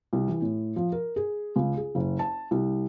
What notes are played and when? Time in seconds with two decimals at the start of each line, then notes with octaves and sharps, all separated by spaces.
0.13 C2
0.28 E3
0.42 A2
0.76 F3
0.92 A#4
1.16 G#4
1.56 C#2
1.77 G#4
1.95 F#1
2.19 A5
2.51 C2